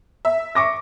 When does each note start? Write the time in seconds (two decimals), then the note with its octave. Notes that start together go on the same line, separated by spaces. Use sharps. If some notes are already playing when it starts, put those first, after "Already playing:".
0.25 E5
0.55 C#6 D6 A#6